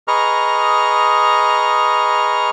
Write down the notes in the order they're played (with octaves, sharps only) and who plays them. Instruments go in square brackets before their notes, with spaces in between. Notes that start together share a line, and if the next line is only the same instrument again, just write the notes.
[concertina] G#4 B4 D#5 A#5 C#6 F6